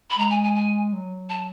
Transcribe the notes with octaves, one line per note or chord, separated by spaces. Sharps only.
B5
G#3 A#5
G#5
G#5
G#5
F#3
A5